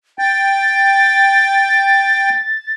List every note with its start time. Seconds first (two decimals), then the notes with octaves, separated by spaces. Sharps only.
0.19 G5 A6